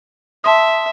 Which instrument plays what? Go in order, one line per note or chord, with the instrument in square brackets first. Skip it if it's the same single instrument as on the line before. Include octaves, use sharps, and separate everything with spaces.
[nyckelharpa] E5 [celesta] A5 C6 D#6